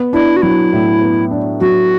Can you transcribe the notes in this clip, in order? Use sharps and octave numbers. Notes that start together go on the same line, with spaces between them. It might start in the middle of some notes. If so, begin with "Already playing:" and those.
Already playing: B3
D4 E4
F#4
F#3 E4
A2
B3
D4
F#3 F#4